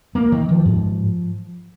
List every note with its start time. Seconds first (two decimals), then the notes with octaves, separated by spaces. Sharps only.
0.15 A#3
0.32 D#3
0.49 F3
0.65 G#2